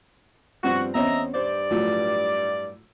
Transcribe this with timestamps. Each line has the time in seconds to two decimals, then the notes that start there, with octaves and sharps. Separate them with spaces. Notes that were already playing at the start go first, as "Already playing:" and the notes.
0.64 G2 F3 C4 F#4
0.95 E2 C4 C#4 D#5 E5 A#5
1.34 G2 C5 D5
1.71 A2 F3 F#3